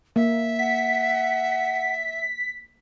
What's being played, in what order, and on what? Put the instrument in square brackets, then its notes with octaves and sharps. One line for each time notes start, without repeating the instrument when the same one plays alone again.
[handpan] A#3 [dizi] E5
[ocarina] F#5 [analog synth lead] B6